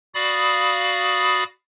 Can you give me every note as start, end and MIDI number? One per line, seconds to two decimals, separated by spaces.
0.15 1.44 66
0.15 1.44 74
0.15 1.44 77
0.15 1.44 83
0.15 1.44 87